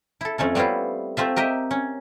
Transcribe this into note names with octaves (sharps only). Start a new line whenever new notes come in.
E4 A4
F2 A3 C#4 A4
G3 B3 C4 E4 F4
A3 C4 F4 E5
G4 A#4 D#5 E5
C#4